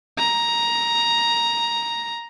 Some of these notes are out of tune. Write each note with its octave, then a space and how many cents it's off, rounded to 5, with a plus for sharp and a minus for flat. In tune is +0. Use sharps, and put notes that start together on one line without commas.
A#5 +10